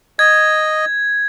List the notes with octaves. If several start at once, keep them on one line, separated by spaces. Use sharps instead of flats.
D#5 G#6